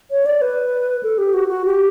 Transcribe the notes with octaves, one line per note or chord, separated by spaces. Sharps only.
C#5
D5
B4
A4
G4
F#4
F#4
G4